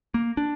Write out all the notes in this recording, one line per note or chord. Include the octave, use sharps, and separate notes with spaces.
A#3
D4